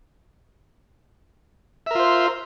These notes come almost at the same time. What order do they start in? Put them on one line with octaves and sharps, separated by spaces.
E5 A#4 F4 C5